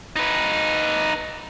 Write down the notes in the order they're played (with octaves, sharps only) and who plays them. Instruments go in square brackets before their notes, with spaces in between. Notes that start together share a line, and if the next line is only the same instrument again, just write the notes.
[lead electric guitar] D#4 B4